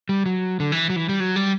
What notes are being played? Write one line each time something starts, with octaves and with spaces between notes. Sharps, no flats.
G3
F#3
D3
E3
F#3
E3
G3
F#3
G3